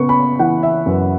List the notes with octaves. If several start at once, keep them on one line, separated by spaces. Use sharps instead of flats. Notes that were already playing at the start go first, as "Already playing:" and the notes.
Already playing: C#3 B3 C#6
B5
E3 F#5
E5
F#2 B4